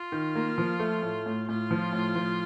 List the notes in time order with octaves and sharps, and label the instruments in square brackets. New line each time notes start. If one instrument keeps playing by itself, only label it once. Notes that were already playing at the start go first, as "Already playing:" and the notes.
Already playing: [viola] F4
[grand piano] D#3
A#3
F3
A3
A2
A2
[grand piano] A2 [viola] F4
[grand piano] F3
A2
F3